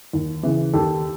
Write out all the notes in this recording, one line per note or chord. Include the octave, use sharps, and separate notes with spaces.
D#2
C#3 E3
D#2 G4 A4